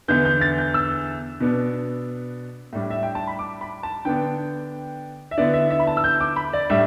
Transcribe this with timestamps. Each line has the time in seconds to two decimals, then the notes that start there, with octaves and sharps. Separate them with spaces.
0.08 E2 D3 B3 G6
0.25 G6
0.41 A6
0.58 G6
0.74 E6
1.40 B2 B3 D4
2.73 A2 G3 D4
2.91 E5
3.03 G5
3.15 A5
3.27 B5
3.39 D6
3.61 B5
3.83 A5
4.05 D3 B3 D4 G5
5.31 E5
5.37 D3 B3 E4 D5
5.54 E5
5.70 E5
5.79 B5
5.87 A5
5.97 E6
6.04 G6
6.20 D6
6.36 B5
6.53 D5
6.70 A2 G3 D4 E5